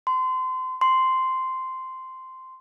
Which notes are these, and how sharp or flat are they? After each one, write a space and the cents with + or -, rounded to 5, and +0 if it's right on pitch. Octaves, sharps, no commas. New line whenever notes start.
C6 -30
C6 -5